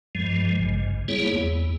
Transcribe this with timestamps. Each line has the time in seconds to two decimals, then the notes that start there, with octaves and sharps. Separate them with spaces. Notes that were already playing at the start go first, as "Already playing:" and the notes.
0.15 G2 F3 G#3
0.59 G#1 G2 C#3
1.08 G3 A#3 B3 E4 G#4 C#5
1.33 E2